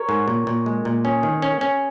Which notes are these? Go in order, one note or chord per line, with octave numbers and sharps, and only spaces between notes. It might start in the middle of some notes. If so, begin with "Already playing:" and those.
Already playing: A#4 C#5
G#2
A#2
A#2
G#3
A#2
C#4 G#4
D#3
C#4
C#4